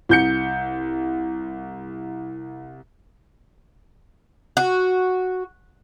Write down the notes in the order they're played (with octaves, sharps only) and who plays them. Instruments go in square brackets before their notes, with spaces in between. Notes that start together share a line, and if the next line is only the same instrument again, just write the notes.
[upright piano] C2 G6 C#7
[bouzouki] F#4